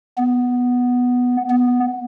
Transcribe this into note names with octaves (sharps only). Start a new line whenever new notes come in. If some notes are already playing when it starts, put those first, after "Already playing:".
B3
B3